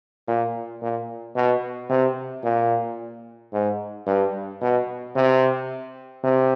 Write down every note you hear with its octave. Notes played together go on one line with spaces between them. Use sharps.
A#2
A#2
B2
C3
A#2
G#2
G2
B2
C3
C3